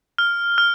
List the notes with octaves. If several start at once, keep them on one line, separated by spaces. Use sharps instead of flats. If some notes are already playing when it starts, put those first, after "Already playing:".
F6
F6